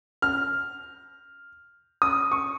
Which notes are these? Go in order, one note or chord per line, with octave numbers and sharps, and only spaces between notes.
F6
D#6
C#6